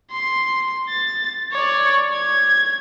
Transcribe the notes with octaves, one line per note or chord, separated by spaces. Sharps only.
C6
A6
C#5 D5
G#6